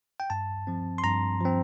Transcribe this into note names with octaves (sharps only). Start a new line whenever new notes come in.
G5
G2 A5
F3 C4
C6
G2 A#5
F3 C4